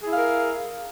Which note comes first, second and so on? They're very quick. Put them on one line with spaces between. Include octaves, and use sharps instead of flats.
G#4 E4 F5 A#4